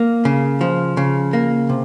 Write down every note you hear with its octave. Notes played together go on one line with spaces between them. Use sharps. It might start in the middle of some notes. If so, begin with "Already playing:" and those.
Already playing: A#3
C#3
F3
C#3
A#3
C3